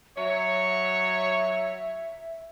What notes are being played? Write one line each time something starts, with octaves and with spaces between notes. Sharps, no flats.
F#3 C#5 E5